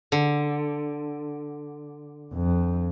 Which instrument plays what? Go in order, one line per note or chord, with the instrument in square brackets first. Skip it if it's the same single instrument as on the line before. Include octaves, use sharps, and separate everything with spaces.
[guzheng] D3
[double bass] F2